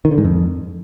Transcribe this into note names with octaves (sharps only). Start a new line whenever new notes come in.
D#3
D3
G#2
F2